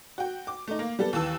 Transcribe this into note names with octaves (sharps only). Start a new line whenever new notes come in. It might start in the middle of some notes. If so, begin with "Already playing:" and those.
F#4 G5
D6
A3 D#4
A#3
G3 B3 A4
D#2 E3 A5 E6